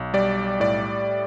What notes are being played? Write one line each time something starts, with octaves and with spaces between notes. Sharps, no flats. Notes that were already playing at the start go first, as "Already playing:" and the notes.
Already playing: B1
G3 D5
A2 D5